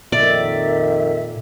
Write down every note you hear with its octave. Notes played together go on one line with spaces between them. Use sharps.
F2 A#2 D#3 D5 E5